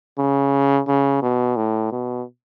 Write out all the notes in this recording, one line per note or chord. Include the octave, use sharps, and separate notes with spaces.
C#3
C#3
B2
A2
B2